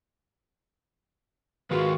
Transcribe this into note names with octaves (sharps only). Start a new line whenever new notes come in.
D#3 F4 F#4 G#4 A#4 B4